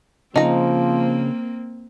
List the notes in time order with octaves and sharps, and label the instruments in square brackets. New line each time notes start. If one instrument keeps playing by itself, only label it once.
[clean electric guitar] C#3 [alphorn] F3 [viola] A#3 C4 [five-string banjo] D#4 A#5